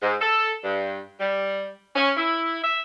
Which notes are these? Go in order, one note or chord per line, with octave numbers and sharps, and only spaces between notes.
G#2
A4
G2
G3
C#4
E4
E5